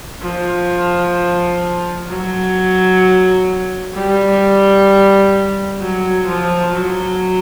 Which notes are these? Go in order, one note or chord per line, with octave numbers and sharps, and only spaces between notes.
F3
F#3
G3
F#3
F3
F#3